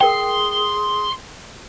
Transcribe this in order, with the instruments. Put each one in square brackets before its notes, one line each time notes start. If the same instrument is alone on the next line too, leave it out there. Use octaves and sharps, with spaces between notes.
[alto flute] G#4 [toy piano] A#4 G5 [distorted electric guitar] C6